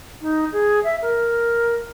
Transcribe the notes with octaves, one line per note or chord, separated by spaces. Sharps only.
D#4
G#4
E5
A#4